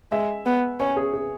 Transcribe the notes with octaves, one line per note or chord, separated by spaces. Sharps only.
G#3 E5
B3
C#4 C#5
G#4
G#4